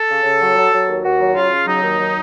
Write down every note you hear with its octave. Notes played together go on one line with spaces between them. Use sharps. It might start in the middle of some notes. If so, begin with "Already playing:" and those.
Already playing: A4
C#3
C#3
F#3
F#3
F#3
D#2
D#2 F#4
F#3
C#3 F4
C#3
F#3 D#4
D#2
F#3